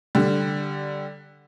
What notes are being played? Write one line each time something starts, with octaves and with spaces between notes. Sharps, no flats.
D3 G3